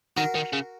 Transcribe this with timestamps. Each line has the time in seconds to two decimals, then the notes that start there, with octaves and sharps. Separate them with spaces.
0.17 D#3 F#4 A#4
0.35 D#3
0.53 C#3